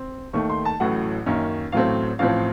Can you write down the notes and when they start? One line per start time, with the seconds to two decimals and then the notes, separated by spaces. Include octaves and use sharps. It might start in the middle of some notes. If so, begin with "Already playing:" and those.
Already playing: C4
0.33 D#2 D#3 A3 C#6
0.50 C6
0.65 A5
0.80 A1 A2 F#3 A3 F#5
1.26 F#2 D#3 A#3 C#4
1.72 A1 A2 F#3 A3 C4 F5
2.19 A1 A2 F3 C4 F5